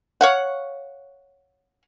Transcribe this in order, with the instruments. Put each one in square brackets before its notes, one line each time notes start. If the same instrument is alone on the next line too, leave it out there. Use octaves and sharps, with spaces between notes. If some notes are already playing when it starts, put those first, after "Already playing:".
[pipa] C#5 F5 F#5